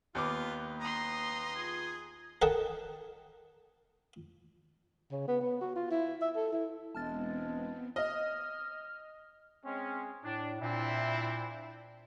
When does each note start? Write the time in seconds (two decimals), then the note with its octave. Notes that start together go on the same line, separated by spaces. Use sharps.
0.15 D#2 A#3 B3 F4 D6
0.80 A#5 C6 D#6
1.56 F4 G#4
2.42 A4 A#4 D#5 F#5 G5 A5
5.11 C#3
5.28 B3
5.41 B3
5.61 F#4
5.76 F4
5.91 E4
6.21 E5
6.36 A4
6.53 E4
6.95 E1 G#3 B3 C4 A5 F6 A6
7.96 D#5 F6
9.65 G#3 C4 C#4
10.25 A2 D4
10.61 A#2 C4 D4 E4